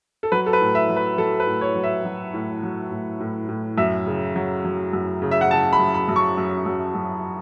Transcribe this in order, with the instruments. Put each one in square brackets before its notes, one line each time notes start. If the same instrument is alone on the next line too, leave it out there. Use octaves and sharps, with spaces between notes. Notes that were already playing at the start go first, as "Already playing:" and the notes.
[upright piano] A4
F#3 B4
A4
B4
A2
E5
F#3
B4
F#3 A4
B4
A2
C#5
F#3
E5
F#3
A2
F#3
A2
A2
A2
F#2 E5
C#3
F#3
F#3
F#2
C#3
E5
F#5
C#3 A5
B5
F#2
B5
F#2
C#6
F#2
F#2
F#2